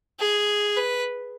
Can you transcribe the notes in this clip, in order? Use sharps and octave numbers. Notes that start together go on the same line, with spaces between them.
G#4
B4